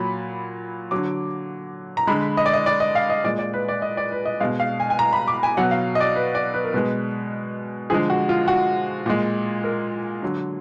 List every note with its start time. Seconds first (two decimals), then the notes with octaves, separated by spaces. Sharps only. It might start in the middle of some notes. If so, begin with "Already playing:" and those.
Already playing: A#2 F#3 B5
0.91 D3 F#3 D6
1.97 A#5
2.07 D3 G#3 B5
2.37 D#5
2.46 D5
2.54 D#5
2.66 D5
2.80 D#5
2.95 F5
3.10 D#5
3.24 A#2 G#3 D5
3.39 D5
3.54 B4
3.68 D5
3.82 D#5
3.97 D5
4.12 B4
4.25 D#5
4.40 B2 G#3 F5
4.60 F5
4.80 G#5
4.90 G#5
4.99 A#5
5.13 B5
5.28 D6
5.43 G#5
5.57 B2 F#3 F#5
5.71 F5
5.95 D#5
6.00 D5
6.16 B4
6.35 D5
6.54 B4
6.64 A#4
6.73 B2 G#3 B4
7.90 D3 F3 G#3 G#4
8.10 F#4
8.29 F4
8.48 F#4
9.06 A#2 G#3
9.64 A#4
10.22 D3 F#3